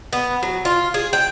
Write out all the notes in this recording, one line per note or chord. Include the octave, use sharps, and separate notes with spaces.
B3
F#3
F4
G#4
G5